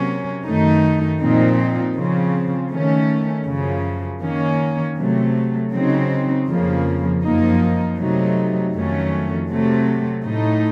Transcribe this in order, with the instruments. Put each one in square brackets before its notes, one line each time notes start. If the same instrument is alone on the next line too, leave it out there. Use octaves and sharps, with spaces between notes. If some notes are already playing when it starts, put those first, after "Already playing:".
Already playing: [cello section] C3 F#3 A#3 C#4
F#2 D#3 A3 D#4
A#2 F3 C4 D#4
C#3 F3 C4
D#3 A3 C#4
F#2 C#3 F3
D#3 A#3 C#4
C3 F#3 A3
C#3 F#3 C4 D#4
F2 C#3 F3 A#3
F#2 F3 A#3 D#4
C3 F#3 A3 D#4
F2 D#3 F#3 A3 C#4
C3 F#3 A3
A2 A3 D#4